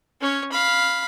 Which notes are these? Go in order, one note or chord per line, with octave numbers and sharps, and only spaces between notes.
C#4 C#5
F5 B5